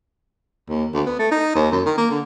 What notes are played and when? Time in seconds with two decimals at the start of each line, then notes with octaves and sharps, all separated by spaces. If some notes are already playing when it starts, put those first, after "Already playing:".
0.68 D#2
0.94 D2
1.07 B3
1.19 A3
1.31 D#4
1.55 D#2
1.72 F#2
1.86 D#3
1.98 A#3
2.10 D3